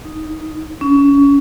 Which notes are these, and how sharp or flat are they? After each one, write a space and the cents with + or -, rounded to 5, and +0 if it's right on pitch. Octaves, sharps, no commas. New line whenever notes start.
D#4 +0
C#4 +25